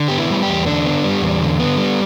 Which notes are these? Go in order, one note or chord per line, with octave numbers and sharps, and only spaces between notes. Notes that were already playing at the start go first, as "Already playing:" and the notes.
Already playing: D3
B3 G4
E4
G3
G4
E2
D3 D4
B3
G3
E2
D3
B3
G3